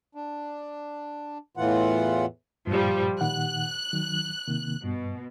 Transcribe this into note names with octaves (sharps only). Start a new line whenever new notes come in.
D4
E2 A2 E3 F4 F#5
G2 A#2 F3 G3
A#2 D#3 F#5 F#6
D#3 F#3
C3 D#3 A#3
G2 B2